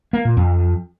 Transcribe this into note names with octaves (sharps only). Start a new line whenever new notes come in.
A#3
A#2
F2